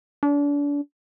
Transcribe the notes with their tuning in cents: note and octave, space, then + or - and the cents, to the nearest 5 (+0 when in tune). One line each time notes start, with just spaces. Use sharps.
D4 -35